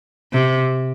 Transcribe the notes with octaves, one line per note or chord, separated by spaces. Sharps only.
C3